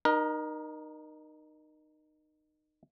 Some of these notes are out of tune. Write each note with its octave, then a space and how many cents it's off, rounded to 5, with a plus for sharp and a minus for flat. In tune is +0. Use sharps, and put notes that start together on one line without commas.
D#4 -25 A#4 +25